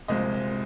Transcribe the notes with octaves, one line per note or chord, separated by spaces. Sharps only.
C2 A#2 F3 G#3 C4 D#5